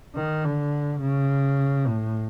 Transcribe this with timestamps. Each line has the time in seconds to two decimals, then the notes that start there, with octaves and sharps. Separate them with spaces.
0.15 D#3
0.44 D3
1.01 C#3
1.87 A2